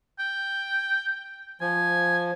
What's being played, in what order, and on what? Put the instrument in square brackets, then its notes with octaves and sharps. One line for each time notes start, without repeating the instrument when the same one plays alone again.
[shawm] G5
[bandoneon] F3 [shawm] G#5